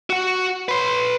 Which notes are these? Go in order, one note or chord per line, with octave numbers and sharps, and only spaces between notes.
F#4 F#5
B4 C6